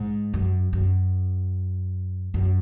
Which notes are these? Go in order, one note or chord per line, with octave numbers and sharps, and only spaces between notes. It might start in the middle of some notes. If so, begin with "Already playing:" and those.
Already playing: G#2
F#2
F#2
F#2